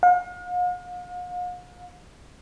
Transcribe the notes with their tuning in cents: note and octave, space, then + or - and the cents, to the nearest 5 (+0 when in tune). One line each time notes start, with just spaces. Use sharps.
F5 +45